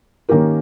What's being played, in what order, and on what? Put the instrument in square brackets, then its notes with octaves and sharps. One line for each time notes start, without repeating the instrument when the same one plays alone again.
[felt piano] D#3 A#3 C#4 G4 A#4